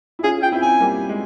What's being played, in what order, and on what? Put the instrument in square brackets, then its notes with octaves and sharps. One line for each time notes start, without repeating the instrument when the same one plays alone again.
[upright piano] E4
[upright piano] C#4 F4 [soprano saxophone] G#4
[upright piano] F4 [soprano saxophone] G5
[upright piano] C4 E4
[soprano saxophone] G#5
[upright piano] G3 A#3
G#3